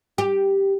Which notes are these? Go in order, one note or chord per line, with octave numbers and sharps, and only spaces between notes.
G4